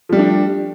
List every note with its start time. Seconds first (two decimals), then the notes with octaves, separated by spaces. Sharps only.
0.09 F3
0.13 G3
0.16 A3
0.19 D4